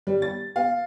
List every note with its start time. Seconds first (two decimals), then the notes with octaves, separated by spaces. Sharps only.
0.07 G3
0.22 A6
0.56 F5